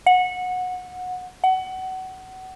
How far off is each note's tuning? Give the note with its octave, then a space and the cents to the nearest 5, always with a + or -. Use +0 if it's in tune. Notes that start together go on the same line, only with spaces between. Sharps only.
F#5 -20
F#5 +25